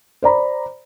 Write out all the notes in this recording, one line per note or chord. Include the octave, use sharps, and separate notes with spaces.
C5 D5 A#5 B5